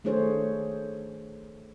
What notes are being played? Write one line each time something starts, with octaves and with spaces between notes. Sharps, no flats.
D#3 A3 D4 G#4 C5 C#5